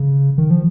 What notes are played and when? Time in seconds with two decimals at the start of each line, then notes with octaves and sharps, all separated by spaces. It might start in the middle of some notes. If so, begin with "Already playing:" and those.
Already playing: C#3
0.38 D#3
0.50 F3